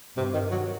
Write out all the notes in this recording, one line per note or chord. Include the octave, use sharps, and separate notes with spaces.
G2 C3
D#3
F#3